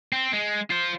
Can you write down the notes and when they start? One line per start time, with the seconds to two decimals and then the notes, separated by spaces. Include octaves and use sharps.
0.12 C4
0.33 G#3
0.70 F4 C5